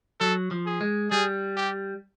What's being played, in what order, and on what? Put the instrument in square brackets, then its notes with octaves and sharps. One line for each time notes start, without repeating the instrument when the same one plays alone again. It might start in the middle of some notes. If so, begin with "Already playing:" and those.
[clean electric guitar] F#3 [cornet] A4
[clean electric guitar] F3
[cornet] G#4
[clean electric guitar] G#3
[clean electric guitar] G3 [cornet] G#4
[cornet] G4